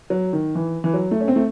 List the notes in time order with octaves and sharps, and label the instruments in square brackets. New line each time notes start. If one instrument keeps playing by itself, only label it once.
[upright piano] F#3
D#3
E3
E3
F#3
A3
C#4
C4
A3